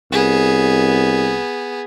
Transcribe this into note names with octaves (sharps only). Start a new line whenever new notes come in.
C2 B3 G#4